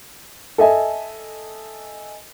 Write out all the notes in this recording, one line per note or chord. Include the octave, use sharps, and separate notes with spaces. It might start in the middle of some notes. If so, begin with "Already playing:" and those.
A4 D#5 E5 G#5